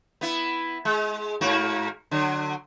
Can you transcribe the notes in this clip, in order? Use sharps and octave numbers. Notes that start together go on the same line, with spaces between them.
B3 E4
G#3
G#2 A#3 F#4
D3 F#3